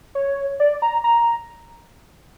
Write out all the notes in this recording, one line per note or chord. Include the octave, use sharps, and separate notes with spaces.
C#5
D5
A#5
A#5